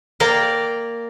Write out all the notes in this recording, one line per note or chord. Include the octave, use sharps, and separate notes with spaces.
A#3 A#4 D5 F5 G5